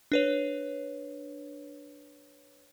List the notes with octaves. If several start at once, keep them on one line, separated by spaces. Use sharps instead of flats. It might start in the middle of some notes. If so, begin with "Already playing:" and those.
D4 B4 C#5